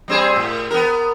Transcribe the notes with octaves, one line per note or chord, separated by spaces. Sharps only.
G3 C4 G#4
A2
B3 A#4